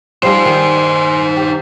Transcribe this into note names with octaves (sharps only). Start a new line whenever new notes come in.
F3 G3 D#4 G4 C5
D#3
G4